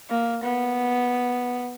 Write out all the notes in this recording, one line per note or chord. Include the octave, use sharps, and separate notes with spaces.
A#3
B3